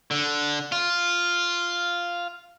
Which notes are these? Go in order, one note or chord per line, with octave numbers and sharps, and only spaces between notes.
D3
F4